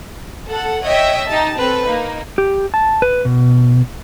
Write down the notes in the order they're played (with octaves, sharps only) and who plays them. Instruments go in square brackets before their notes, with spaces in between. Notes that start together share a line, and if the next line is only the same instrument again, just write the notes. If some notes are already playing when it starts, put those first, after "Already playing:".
[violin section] A4 F#5
C#5 D#5 E5 G5
D#4 G4 A5
C4 A4 B4
A#3 D#4
[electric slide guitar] G4
A5
B4
B2